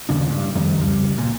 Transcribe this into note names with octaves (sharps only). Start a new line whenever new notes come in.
D#2 C#3 D4
G2
F2 D#3 G3
C#2 G3
A#2